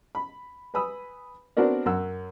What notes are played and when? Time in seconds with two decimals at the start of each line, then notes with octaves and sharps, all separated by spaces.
0.15 B5
0.74 B4 G#5 B5 D#6 E6
1.57 B3 C4 D4 F#4 A#4 D5
1.86 F#2 F#5 E6